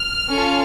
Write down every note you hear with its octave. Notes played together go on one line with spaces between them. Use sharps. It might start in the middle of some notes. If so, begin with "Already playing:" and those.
Already playing: F6
C#4 F4 A4